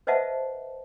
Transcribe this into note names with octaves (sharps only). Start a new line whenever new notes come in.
B4 C5 D#5 E5 F#5 A5